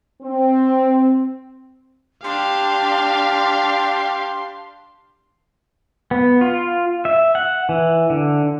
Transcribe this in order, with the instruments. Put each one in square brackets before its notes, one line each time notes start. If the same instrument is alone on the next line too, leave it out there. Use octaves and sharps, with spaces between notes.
[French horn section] C4
[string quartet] D4 [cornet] G4 [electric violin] F5 [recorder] C6
[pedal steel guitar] B3
F4
E5
F#5
E3
D3